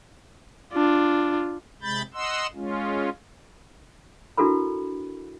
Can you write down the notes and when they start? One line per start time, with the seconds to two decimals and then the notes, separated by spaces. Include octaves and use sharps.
0.73 D4 F4
1.82 C3 G#3 B5 G6 A6
2.14 D#5 F#5 C6 E6
2.54 G#3 C#4 F4
4.38 D4 E4 F#4 A4 A#4 B5